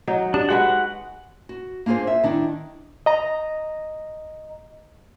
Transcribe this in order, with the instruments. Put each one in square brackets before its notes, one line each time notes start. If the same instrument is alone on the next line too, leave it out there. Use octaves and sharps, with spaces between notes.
[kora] F#3 D#4
[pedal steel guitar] D4 [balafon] G4
[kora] G#3 F#4 B4 [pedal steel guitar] F#5
[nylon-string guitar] F#4
A#3 D4 F4 G#4 C5
E5
D#3 D4 E4
[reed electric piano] D#5 A#5